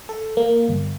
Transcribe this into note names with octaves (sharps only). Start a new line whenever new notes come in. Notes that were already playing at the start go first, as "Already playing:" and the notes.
A4
A#3
G1